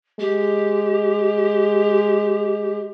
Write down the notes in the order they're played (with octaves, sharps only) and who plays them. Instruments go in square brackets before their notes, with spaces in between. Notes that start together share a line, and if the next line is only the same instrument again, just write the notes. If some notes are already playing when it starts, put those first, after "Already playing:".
[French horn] G#3 [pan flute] G4